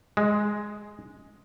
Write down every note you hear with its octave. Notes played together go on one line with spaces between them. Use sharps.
G#3